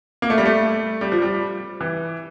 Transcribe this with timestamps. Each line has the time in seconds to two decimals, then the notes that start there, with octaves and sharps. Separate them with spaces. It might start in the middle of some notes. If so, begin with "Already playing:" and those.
0.22 A#3
0.30 A3
0.38 G3
0.46 A3
1.01 G3
1.12 F3
1.22 G3
1.81 E3